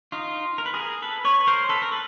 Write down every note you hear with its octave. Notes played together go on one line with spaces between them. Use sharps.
D#4 F4
A#4
B4
G#4 A#4
A4 B4
B4 C#5
A#4 C5
A4 B4
A#4
A4 B4